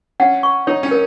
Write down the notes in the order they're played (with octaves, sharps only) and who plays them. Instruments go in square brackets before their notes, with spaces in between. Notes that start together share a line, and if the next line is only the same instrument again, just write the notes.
[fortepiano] C#4 [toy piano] F#5
[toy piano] C#6
[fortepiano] D#4 [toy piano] C#5
[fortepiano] C#4
[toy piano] A#4